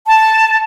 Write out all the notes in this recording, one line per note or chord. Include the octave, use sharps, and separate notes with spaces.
A5